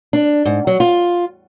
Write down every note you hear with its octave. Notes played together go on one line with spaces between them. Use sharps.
D4
G#2
F#3
F4